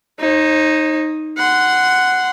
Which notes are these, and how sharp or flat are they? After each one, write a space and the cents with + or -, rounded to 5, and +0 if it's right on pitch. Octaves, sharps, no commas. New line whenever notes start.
D#4 +0 C5 +45
F#5 +0 C6 -20